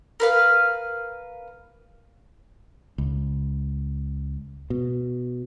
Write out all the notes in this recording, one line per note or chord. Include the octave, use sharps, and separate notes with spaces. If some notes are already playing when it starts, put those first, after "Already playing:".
A#4 B4 F5
C#2
B2